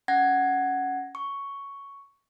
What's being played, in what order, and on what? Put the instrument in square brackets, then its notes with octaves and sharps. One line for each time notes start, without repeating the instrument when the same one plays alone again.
[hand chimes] C#4 F#5 G#6 A#6
C#6